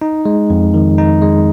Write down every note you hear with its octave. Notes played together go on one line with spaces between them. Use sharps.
D#4
G#3
F2
D#3
D#4
G#3